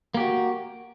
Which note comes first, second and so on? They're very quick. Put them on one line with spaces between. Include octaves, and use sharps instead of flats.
A#3 G4 F#4